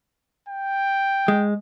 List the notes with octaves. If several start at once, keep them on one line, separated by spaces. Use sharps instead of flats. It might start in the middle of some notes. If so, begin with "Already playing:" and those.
G5
G#3